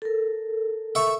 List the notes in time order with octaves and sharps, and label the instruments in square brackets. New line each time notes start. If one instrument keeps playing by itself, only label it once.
[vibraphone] A4 A#4
[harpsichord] E5 C#6